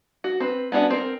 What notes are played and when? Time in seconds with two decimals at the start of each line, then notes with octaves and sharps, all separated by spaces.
0.24 F#4
0.40 C4 B4
0.72 B3 C#4 D4 F4 F#4
0.90 C4 A#4